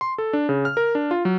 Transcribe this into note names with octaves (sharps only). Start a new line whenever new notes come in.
C6
A4
D4
C#3
F6
A#4
D4
F4
F#3